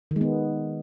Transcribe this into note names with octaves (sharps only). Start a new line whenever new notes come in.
D#3 G#3 B3